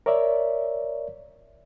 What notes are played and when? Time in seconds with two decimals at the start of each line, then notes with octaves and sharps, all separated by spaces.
0.06 A#4 C#5 D5 E5